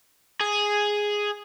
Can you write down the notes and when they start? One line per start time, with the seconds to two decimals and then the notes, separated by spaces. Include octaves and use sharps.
0.40 G#4